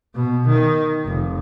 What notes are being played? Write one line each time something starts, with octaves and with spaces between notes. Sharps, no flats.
B2
D#3
F1